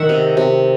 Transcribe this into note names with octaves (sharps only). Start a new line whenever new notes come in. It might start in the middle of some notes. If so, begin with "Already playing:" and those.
Already playing: D#3 E5 F#5
C3
C3